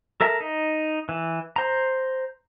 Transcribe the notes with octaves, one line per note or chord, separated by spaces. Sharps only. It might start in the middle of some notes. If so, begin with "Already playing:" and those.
A4 A#4 E5 A#5
D#4
E3
C5 A#5